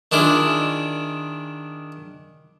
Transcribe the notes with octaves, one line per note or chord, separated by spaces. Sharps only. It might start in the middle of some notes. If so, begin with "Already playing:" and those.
D#3 D4 E4 F4 G#4